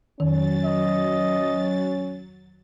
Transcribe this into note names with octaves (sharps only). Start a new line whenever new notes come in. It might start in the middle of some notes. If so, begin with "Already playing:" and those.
F2 D#3 F#3 C#4 A6
D#5